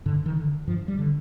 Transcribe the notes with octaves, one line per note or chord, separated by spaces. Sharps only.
G2 D3
D#3
D3
G2 F3
G3
D3